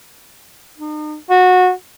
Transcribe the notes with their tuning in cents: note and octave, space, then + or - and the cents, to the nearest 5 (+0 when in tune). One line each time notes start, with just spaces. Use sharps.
D#4 -40
F#4 -20